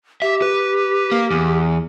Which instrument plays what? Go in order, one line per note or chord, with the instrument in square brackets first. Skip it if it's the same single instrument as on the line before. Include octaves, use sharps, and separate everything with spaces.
[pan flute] G4 [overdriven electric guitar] E5
[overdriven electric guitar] B4
A#3
E2